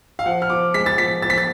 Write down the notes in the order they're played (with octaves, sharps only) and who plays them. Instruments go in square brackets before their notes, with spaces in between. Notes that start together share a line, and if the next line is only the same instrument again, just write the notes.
[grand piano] F5
F3 F#5
F6
F3 D6
G#3 B6
A6
F3 B6
F3 A6
B6
A6